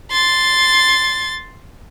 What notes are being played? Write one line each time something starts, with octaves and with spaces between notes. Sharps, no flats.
C6 A6